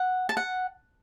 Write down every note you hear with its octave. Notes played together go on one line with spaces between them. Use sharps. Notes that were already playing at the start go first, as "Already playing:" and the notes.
Already playing: F#5
A5
F#5